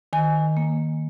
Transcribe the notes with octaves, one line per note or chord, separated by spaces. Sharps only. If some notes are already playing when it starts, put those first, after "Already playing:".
D#3 G#5
A#3